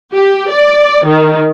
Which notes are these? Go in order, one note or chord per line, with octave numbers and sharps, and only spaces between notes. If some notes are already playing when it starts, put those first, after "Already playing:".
G4
D5
D#3